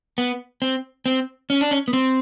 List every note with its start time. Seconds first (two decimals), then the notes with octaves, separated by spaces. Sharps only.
0.18 B3
0.62 C4
1.06 C4
1.50 C#4
1.61 D4
1.71 C#4
1.88 B3
1.93 C4